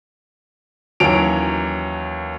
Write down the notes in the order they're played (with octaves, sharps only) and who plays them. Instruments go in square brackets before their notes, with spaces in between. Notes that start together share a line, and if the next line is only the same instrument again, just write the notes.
[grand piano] D#2 E3 F#3 C#4 D7 F7